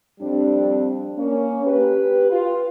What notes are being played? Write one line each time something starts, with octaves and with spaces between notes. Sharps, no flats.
F2 G3 C4 D4
A#3 C#4
G4 B4
F4